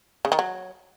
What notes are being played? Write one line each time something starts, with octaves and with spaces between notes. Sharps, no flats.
C#3
D#3
F#3